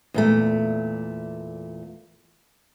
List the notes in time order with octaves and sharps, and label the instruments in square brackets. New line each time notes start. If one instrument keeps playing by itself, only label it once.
[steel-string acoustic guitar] E2 A#2 A3